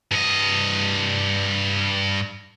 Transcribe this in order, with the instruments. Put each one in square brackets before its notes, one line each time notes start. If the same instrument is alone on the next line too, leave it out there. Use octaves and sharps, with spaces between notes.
[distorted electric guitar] G2 D#5